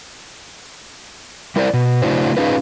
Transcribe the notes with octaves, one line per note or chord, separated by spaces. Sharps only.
G3 E4 A#4 C5 D5
B2
C#3 A3 D4 E4 F#4 C5
C#4 D#4 F4 G#4 B4